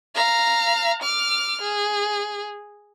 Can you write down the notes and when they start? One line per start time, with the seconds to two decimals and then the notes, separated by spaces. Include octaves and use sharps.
0.15 F5 A#5
1.02 D6 F6
1.62 G#4